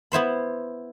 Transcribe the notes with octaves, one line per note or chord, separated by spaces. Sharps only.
B3 E4 C5 B5